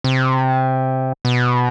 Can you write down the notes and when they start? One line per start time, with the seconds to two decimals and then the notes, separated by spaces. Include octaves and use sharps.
0.04 C3
1.25 B2